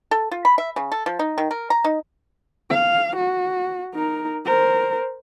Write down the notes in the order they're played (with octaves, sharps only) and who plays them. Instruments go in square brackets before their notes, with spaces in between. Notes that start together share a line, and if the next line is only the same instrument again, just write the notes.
[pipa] A4
F4
B5
E5
C#3
A4
F3
D#4
D#3
A#4
A#5
D#4
[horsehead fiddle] F5
F#4
D#4 A#4
A#4 C5